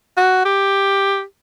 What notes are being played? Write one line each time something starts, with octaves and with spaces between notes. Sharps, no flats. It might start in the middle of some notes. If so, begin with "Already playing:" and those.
F#4
G4